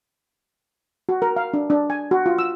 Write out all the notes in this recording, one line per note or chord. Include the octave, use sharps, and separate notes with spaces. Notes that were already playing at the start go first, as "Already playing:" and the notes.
F#4
A#4
F5
D4
D4
G#5
F#4
F4
E6